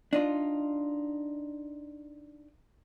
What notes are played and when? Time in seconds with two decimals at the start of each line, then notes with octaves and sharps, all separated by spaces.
0.13 D4 D#4 F4